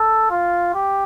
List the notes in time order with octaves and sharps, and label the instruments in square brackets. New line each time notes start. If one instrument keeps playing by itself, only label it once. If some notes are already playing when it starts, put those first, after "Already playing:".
Already playing: [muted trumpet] A4
F4
G4